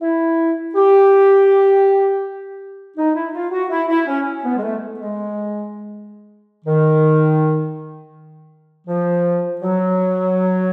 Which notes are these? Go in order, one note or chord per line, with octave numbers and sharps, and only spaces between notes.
E4
G4
D#4
E4
F4
F#4
E4
E4
C#4
B3
G#3
A3
G#3
D#3
F3
F#3